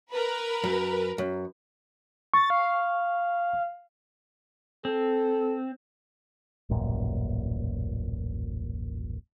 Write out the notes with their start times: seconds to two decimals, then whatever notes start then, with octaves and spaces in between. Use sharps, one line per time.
0.11 A#4 B4
0.64 F#2
1.18 F#2
2.34 C#6 A6
2.50 F5
4.85 C4 A4
6.69 D#1 A1 F#2 A#2